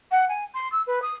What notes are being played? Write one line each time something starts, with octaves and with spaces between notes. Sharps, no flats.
F#5
G#5
C6
E6
B4
D#6